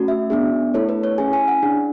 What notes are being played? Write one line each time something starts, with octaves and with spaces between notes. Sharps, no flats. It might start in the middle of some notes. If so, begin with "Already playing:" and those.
Already playing: A3 C#4 F#4
E5
B3 D4 G#4
A3 E4 A4 C#5
B4
C#5
C#4 E4 G#4 G#5
G#5
F#5
D4 G#4